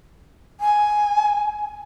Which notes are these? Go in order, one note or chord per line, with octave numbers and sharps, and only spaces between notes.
G#5